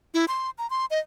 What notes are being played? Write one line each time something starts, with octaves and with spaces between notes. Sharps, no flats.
E4
C6
A#5
C6
D#5